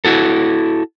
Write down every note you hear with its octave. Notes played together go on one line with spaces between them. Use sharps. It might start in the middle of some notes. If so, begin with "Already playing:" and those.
E4 F#4 A4